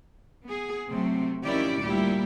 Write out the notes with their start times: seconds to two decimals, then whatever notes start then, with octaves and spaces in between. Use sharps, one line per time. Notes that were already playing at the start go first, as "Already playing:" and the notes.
0.44 B3 G#4
0.89 C3 F#3 A3 C4
1.45 D#3 F3 C#4 E4 G4 D5
1.81 D2 A#2 G3 E4 G4